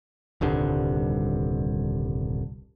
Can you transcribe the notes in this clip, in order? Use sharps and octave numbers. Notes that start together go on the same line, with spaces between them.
D#1 C2 G2 D3